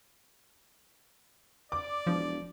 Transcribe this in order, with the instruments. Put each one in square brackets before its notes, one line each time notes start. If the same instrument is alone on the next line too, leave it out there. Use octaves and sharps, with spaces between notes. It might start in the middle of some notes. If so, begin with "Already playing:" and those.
[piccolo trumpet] D5 [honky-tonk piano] D6
[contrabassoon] E1 [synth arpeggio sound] F3